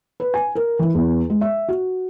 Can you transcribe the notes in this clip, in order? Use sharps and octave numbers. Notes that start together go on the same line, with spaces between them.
B4
G#5
A#4
E3
E2
G#3
E5
F#4